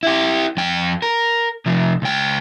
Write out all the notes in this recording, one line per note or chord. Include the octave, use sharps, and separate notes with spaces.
E4 G4
F2 G5
A#4
C3 F3
C#2 G5